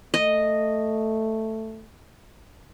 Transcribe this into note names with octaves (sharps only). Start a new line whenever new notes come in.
A3 D#5